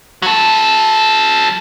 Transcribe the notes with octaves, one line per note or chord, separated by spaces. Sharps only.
F#3 A4